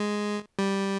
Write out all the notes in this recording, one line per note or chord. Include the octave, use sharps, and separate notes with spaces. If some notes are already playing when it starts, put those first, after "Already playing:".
Already playing: G#3
G3